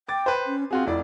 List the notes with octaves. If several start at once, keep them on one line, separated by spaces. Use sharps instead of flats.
G5 D6 A6
B4 C5
C#4
C4 F4 F#4 G#4
F1 E4 D5